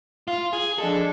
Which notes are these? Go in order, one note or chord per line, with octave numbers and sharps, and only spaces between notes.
F4
G#4
F3 G#3 D4 A4